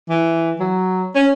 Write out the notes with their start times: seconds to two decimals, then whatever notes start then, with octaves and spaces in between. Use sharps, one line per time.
0.10 E3
0.60 F#3
1.15 C#4